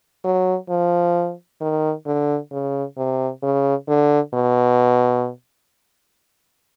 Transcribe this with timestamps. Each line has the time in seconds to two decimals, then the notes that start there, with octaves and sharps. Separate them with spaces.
0.24 F#3
0.69 F3
1.61 D#3
2.06 D3
2.52 C#3
2.98 C3
3.43 C#3
3.88 D3
4.34 B2